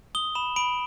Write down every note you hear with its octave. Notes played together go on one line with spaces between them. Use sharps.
D#6 G7
B5 E7
B5 D7